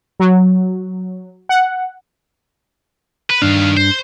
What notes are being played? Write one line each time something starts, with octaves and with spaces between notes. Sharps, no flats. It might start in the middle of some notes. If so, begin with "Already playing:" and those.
F#3
F#5
B4
G2 D#3 D4 F5
C5